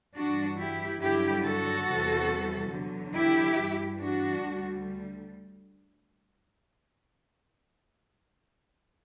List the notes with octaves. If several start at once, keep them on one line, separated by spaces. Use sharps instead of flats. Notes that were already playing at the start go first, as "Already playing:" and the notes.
G2 E3 G3 D4 F#4
E4 G4
G2 D3 F#3 E4 G4
F#4 A4
E2 C3 E3 G3
E2 D3 F#3
E4 G4
G2 E3 G3
D4 F#4
D2 D3 G3